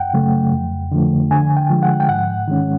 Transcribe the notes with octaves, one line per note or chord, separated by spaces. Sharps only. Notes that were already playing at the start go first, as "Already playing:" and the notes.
Already playing: F#2 F#5 G5
C#3 F#3 A3
F2
D3 F3 A3
D3 G#5
G5
F3 G#3
F#5
G5
G#2 F#5
D#3 G#3 C#4